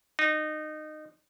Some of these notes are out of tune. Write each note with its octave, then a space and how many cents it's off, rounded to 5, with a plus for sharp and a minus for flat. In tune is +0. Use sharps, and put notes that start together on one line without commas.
D#4 -20